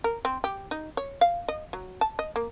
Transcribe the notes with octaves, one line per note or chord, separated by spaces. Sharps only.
A#4
C4
G4
D#4
C#5
F5
D#5
F#3
A5
D#5
A#3